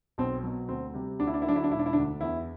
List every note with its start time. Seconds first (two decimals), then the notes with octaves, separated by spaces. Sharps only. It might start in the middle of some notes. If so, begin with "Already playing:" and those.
0.18 B1 C4
0.44 B2 F#3
0.68 D2 C4
0.94 C3 G3
1.19 D2 D4
1.27 E4
1.34 D4
1.42 E4
1.44 D3 F#3 D4
1.56 E4
1.64 D4
1.71 E1 E4
1.79 D4
1.86 E4
1.93 D2 D3 D4
2.21 E2 E4